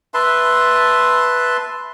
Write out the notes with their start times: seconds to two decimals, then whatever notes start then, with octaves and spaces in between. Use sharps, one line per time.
0.14 B4 E5 A5 C6